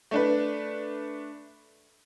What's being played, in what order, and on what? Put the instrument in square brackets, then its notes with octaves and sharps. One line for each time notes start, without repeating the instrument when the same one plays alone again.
[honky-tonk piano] A3 D4 B4